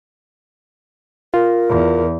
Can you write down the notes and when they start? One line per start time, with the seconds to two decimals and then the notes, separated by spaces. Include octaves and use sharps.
1.34 F4 A#4
1.69 E2